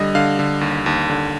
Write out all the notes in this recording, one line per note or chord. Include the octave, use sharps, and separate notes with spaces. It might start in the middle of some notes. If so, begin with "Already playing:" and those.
Already playing: D3 G3 D#5
D3 F5
D3
D#2
D#2
D3